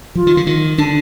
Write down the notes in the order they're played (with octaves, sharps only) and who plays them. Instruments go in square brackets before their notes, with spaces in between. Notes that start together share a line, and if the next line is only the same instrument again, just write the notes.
[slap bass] F3 [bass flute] F4
[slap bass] D#3
D3
D#3
[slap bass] D3 [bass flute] D4